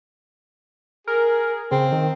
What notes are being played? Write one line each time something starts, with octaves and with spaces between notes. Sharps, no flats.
G#4 A#4
C#3 C4
D#3